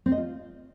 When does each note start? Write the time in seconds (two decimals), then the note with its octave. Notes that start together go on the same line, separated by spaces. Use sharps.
0.06 C4
0.12 D#5
0.18 F4